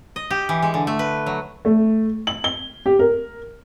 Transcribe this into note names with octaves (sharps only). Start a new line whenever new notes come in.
D#5
G4
E3
G#3
D3
A3
B4
F#3
A3
F#7
G7
G4
A#4